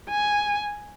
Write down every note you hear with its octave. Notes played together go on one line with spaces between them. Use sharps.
G#5